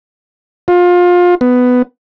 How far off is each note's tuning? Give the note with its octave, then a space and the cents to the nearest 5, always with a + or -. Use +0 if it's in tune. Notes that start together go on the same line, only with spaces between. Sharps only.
F4 +25
B3 +10